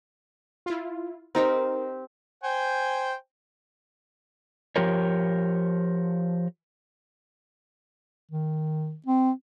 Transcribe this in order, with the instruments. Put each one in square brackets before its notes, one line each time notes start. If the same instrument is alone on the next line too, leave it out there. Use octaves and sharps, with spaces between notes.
[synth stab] E4 F4
[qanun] C4 G4 C5 [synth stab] D#4 A#4
[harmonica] C5 G5 G#5
[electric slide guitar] F3 G4 A#4 C#5
[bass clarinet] D#3
C4